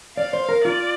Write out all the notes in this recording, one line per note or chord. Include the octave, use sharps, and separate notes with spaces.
D5 F5
C5
A#4
F4 D5